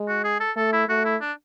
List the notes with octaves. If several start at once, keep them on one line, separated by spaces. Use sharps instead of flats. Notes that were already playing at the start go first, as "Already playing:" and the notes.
Already playing: G#3
F#4
G#4
A4
A3 A4
E4
A3 F#4
E4
D4